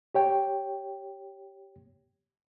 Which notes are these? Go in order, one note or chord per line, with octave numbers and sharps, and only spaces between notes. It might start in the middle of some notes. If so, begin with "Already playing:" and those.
G4 C#5 G5